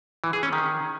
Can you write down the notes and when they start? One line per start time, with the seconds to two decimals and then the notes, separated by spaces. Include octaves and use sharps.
0.24 E3
0.33 G#4
0.43 C#4
0.53 D#3